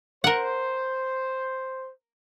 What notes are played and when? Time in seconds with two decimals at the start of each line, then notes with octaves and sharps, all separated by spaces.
0.24 A#4 C5 F#5